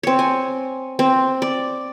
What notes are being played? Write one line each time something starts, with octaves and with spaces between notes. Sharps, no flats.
C4 C#5
G#5
C4
D5